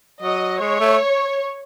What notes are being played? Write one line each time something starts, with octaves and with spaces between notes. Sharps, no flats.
F#3 D#5
G#3 C#5
A3